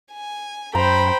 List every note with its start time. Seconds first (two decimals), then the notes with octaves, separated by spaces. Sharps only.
0.13 G#5
0.75 F#2 C5 G5 A#5 B5